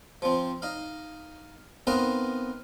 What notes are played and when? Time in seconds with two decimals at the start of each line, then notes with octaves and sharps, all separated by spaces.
0.22 F3 C4
0.62 D#4 F5
1.87 B3 C4 D#4 A#4 F5 F#5